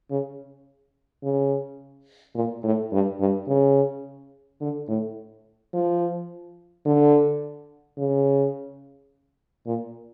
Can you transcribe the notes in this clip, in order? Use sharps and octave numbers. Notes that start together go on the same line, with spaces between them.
C#3
C#3
A#2
A2
G2
G2
C#3
D3
A2
F3
D3
C#3
A#2